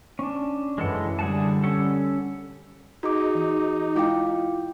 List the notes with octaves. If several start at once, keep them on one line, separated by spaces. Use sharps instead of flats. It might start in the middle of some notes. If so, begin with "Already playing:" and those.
C#4 D4
F#2 E3 G#3 A4 F#5
D3 G3 G#4 F#5 A5
C#4 A4 F#5
D#4 F#4 G#4 D6
E3
G#3 E4 F4 F5 G5 D6